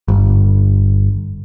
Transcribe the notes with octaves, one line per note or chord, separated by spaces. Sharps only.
G1